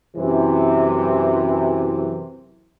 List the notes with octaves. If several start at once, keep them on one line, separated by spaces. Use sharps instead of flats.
F#2 C3 E3